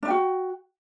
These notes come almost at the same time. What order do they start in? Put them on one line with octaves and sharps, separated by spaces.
D4 E5 G5 F#4